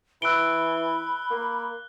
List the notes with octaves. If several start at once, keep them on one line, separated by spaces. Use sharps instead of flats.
E3 B5 E6 F#6 D7 G7
A#3